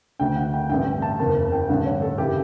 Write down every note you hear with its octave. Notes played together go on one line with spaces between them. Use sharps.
D2 D3 G5
F#5
G5
A1 G2 D3 G5
G5
A5
F#1 E2 C#3 A5
G5
A1 G2 D3 F#5
C#5
A4
F#1 C#3 E3 G4